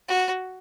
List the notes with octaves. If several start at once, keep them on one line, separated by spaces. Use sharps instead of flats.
F#4